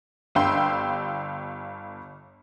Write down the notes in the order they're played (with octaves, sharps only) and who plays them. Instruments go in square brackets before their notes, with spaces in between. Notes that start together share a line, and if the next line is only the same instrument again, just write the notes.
[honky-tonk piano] G1 D3 F5 G5 C6 E6